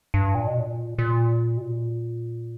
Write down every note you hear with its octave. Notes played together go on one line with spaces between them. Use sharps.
G2
A#2
B2
A#2
A#2
B2
A#2